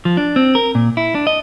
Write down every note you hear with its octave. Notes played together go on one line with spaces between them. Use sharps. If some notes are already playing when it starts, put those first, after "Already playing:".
F3
D4
C4
A#4
A#2
E4
D4
D#5